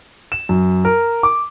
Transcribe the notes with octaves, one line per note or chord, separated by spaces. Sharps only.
E7
F#2
A#4
D6